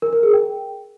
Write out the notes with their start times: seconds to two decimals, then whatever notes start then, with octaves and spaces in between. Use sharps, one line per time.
0.02 A#4
0.13 A#4
0.23 G#4
0.34 G5